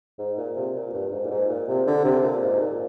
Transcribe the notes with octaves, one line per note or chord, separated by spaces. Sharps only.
G#2
A#2
C3
A#2
G2
G#2
A#2
G#2
A#2
C3
D3
C3
A#2
G#2
A#2